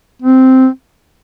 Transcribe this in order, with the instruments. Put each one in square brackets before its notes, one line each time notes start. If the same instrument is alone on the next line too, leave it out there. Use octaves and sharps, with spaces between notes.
[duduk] C4